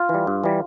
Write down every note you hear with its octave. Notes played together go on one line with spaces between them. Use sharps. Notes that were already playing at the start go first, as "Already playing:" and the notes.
Already playing: F4
E3 G3
G2
E3 G3